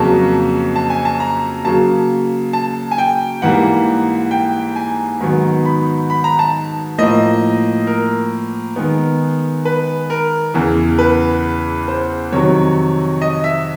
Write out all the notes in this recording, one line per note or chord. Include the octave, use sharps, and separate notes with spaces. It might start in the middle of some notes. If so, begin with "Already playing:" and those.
Already playing: F2 C#3 F#3 A#3 A5
A5
G#5
A5
A#5
C#3 F#3 A#3 A5
A5
G#5
G5
G#2 E3 G3 A#3 F#5
G5
G#5
G#2 D#3 F#3 B3
B5
B5
A#5
A5
A2 F3 A#3 D#5
A#4
D#3 G#3 B3
B4
A#4
E2 C#3 E3
B4
C5
F2 C3 D#3 F#3 C#5
D#5
E5